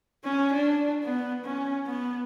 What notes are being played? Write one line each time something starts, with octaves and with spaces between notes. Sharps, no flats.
C#4
D4
B3
C#4
B3